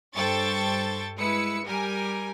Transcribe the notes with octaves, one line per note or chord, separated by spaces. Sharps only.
G2 A4 C5 G5 C#6 A6
G#3 E4 B4 E6 C#7
G3 G4 A#4 G#5